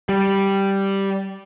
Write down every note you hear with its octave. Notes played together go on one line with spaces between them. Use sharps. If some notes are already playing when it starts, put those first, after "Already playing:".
G3